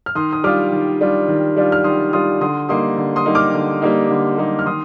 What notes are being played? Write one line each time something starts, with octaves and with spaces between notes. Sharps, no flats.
F6
D#3 C6 D#6
D#6
G3 D4 F4 D6 F6
D#3
G3 D4 F4
D#3
G3 D4 F4
F6
D#3 C6 D#6
G3 D4 F4 C6 D#6
D3 C6 D#6
G3 A#3 D#4 C6 D#6
D3
C6 D#6
G3 A#3 D#4
D6 F6
D3
G3 A#3 D#4
D3
G3 A#3 D#4
F6
D#3 C6 D#6